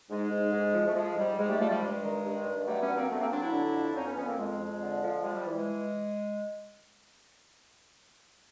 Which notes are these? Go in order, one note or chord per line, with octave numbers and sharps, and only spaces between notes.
G#2 G#3
G#2
G#2
F3
A3
F3 G#3
G#2 G3
G#2 G#3
G3 A3
F3 G3 A3
G3
G2 G#3
D#3
G2
G2
F#3 G3 A3
B3 C#4
G2
A#3 C4
G2 A3 B3
A#3 C4
F#3 C4 D4
D4 E4
D3
F2
F2 C#4 D#4
B3 C#4
F2 B3 C#4
A#3 C4
F2 G#3
F2
D3
F3
G3 G#3
G3
E3
G#3